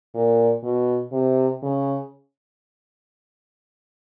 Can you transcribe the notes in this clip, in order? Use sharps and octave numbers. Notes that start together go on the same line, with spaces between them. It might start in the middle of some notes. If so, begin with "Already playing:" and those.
A#2
B2
C3
C#3